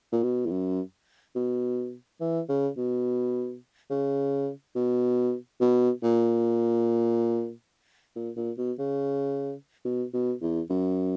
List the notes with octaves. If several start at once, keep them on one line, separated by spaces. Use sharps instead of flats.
A#2
B2
E2
F#2
B2
E3
C#3
B2
C#3
B2
B2
A#2
A#2
A#2
B2
C#3
B2
B2
E2
F#2